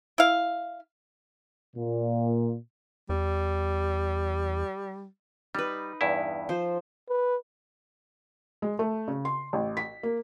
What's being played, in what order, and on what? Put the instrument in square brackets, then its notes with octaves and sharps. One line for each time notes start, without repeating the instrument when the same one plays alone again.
[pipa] E4 F5
[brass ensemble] A#2
[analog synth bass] E2 [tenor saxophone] G3
[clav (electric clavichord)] G3 [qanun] D#4 B4
[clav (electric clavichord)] E2 G2 E4
[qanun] F3 C5
[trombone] B4
[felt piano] G#3
A3
C#3
C6
A1
B6
A#3